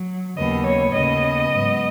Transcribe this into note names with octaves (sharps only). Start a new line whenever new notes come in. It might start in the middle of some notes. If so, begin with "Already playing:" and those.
Already playing: F#3
D#2 C#3 F#3 B3 D#5
C#5
D#2 C#3 B3 D#5
G#2 F#3 B3